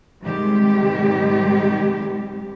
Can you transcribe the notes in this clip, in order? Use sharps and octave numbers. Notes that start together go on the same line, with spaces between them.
G#2 C3 D#3 G3 G#3 G4